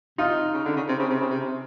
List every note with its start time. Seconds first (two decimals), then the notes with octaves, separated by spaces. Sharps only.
0.18 C3 D#4 F4
0.54 C#3
0.65 D3
0.76 C#3
0.88 C3
0.99 C#3
1.10 C3
1.21 C#3
1.31 C3